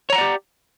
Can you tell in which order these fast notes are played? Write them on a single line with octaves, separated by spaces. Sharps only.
C#5 A#5 F#5 D5 G4